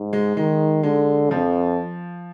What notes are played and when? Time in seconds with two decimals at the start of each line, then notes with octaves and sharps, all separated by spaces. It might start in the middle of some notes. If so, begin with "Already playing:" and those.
Already playing: G#2
0.13 G#3
0.37 D#3 G#3
0.83 D3 G#3
1.31 F2 F3